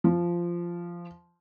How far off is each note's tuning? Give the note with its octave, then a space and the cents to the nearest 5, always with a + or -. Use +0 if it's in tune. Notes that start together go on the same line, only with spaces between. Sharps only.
F3 -10